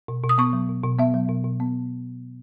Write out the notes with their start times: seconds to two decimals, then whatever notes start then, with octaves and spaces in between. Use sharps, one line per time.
0.08 B2
0.24 B2
0.29 D#6
0.38 B3 C#6
0.53 F#3
0.69 B2
0.84 B2
0.99 B3 E5
1.14 F#3
1.29 B2
1.44 B2
1.60 B3